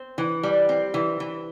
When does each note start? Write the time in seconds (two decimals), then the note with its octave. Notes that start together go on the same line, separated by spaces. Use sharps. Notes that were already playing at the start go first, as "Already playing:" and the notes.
Already playing: C4
0.18 E3
0.43 G3
0.69 C4
0.94 E3
1.20 E3